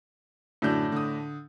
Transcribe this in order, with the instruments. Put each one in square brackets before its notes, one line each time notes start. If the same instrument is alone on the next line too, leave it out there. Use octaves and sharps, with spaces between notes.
[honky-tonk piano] F#2 D3 G6 [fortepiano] A2 D4
[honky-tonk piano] D3 D#6